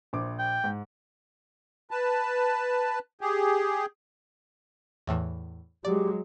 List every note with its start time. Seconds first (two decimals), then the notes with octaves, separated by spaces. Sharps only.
0.13 A#1 C5 D6
0.39 G5
0.64 G#2
1.91 B4 A5
3.21 G4 G#4
5.07 E2 A2 E3
5.85 F#3 G#3 G4 D5